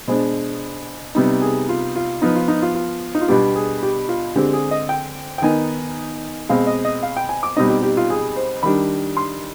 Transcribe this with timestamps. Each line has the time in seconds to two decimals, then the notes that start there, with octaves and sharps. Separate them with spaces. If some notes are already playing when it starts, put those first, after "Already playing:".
0.08 B2 G#3 D4 C5
1.15 C3 G3 B3 D#4
1.42 G#4
1.69 F4
1.96 F4
2.22 F3 B3 D#4
2.36 F4
2.48 D#4
2.62 F4
2.75 F4
3.15 D#4
3.21 F4
3.28 B2 G3 B3 D4 G4
3.55 G#4
3.83 G4
4.09 F4
4.36 D3 G#3 C4 G4
4.53 G#4
4.71 D#5
4.89 G5
5.38 G5
5.42 D#3 B3 D#4 G#5
6.49 B2 G#3 C4 F5
6.67 D#5
6.85 D#5
7.03 F5
7.17 G5
7.29 G#5
7.43 D6
7.57 B2 G3 C4 D#4 D#5
7.70 G4
7.83 G4
7.97 F4
8.10 G#4
8.36 C5
8.63 D#3 G3 D4 B5
9.17 C6